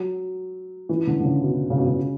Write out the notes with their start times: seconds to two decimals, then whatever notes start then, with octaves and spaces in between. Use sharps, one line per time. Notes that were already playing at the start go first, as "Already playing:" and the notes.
Already playing: F#3
0.89 E3
1.07 D3
1.20 D3
1.25 C#3
1.43 B2
1.70 C#3
1.78 B2
1.85 C#3